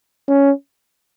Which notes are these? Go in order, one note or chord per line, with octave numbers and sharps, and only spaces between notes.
C#4